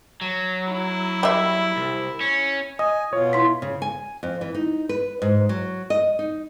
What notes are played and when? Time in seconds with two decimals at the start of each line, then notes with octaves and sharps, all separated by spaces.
0.21 F#3
0.72 E4
1.23 G3 E5
1.77 C2
2.21 C#4
2.79 D#5 G#5 D#6
3.13 B2 F4 C#5
3.33 E4 C6 B6
3.62 C#3
3.82 G#5
4.23 F2
4.41 E3
4.55 D#4
4.89 B4
5.22 G#2
5.49 F#3
5.90 D#5
6.19 D#4